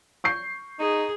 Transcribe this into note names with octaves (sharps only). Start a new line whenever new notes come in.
C#6 G6 C7
D#4 G#4